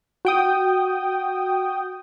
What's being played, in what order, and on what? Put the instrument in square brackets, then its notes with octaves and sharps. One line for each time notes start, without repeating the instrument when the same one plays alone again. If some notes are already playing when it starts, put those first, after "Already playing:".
[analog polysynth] F#4 G5 D#6